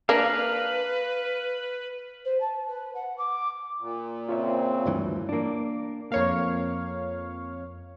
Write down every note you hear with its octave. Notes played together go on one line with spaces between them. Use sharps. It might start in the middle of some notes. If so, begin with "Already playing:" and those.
A#3 D4 B4 F5
C5
A5
B4
F#5
D6
A#2
C#3 C4 F4 C#5 E5
D2 G2 E3
A#3 D4
F2 A#3 C#5 F5